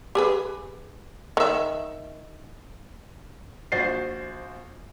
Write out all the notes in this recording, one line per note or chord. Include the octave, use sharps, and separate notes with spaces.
G4 G#4 B4
D#3 E5
A#1 F#4 C5 A6 C7